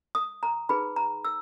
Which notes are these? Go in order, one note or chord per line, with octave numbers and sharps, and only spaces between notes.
D#6
A#5
D#4 G#4 B4 B5
A#5
E6